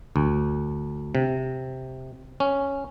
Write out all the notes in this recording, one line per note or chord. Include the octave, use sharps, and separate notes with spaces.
D2
C3
C#4